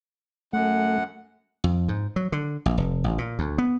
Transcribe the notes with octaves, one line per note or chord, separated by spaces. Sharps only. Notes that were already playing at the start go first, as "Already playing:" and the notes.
F#2 A3 F#5
F2
G#2
F#3
D3
A#1
F1
A1
A#2
D2
B3